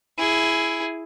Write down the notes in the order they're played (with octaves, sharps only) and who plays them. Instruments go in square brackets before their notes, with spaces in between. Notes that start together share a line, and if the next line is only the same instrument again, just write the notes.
[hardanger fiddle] E4 G#4